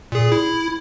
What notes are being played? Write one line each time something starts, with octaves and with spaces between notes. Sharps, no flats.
A#2 G#4
E4